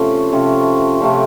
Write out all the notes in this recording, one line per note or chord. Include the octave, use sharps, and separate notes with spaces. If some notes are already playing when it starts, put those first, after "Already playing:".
Already playing: C3 F3 A3 C#4
C3 F3 A3 C#4
C3 F3 A3 C#4